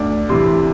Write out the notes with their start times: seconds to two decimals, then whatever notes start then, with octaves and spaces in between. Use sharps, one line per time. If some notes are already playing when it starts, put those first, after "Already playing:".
Already playing: D2 D5
0.29 C3 E3 C6